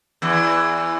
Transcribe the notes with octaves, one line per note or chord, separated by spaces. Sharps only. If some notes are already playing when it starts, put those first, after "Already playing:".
E2 E3